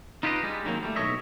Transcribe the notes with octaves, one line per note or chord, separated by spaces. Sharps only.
D#4 F4 G4 G#4 B4 D#5
G3 G#3
D3 D#3 F#3 A#3 C4
G3 A3
B1 A2 C#5 D#5 E5